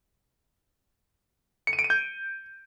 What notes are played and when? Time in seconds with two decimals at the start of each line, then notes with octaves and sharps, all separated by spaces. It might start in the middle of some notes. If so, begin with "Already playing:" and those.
1.67 C#7
1.73 D#7
1.79 D7
1.84 D#7
1.90 G6